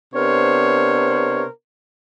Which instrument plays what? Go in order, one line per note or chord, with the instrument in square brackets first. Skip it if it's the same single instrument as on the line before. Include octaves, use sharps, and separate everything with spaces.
[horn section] C3 B3 D4 A#4 C5 C#5